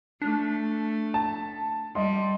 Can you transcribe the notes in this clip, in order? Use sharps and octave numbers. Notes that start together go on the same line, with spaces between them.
A3 D4
A5
G3 D#5 C6